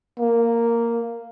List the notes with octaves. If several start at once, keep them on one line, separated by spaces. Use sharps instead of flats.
A#3